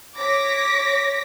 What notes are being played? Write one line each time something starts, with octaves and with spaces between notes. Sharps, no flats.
C#5 D6 A#6 B6